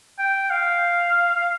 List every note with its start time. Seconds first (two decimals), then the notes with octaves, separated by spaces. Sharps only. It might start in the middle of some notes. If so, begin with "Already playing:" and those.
0.18 G5
0.50 F5